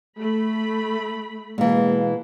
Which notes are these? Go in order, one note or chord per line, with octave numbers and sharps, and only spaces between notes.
A3 B5
B2 E3 G#3 A#3